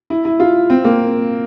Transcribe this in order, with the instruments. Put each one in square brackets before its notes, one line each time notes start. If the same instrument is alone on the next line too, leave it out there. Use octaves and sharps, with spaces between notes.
[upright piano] E4
E4
F4
C4
A#3